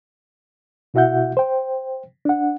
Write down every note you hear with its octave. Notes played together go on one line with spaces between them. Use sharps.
B2 E4 F#4 E5 F#5 G6
C5 G5
D4 F#5